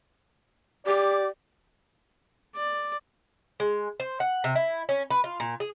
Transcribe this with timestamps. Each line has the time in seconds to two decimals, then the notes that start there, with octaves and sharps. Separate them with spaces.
0.86 G4 D5
2.55 D5
3.60 G#3
4.00 C5
4.20 F#5
4.44 C3
4.55 E4
4.89 C#4
5.11 B4
5.24 F4
5.40 A#2
5.60 G#4